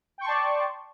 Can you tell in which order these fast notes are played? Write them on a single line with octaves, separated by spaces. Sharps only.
G5 C#6 C6 A5 D5